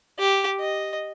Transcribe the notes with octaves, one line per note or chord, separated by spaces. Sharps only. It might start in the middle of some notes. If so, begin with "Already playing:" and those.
G4
D#5